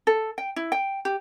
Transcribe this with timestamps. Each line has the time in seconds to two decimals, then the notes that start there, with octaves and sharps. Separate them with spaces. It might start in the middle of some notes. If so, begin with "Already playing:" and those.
0.07 A4
0.38 G5
0.56 E4
0.72 G5
1.05 G4